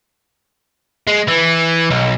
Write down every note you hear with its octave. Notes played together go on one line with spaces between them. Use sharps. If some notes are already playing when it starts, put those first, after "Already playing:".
G#3
E3
B1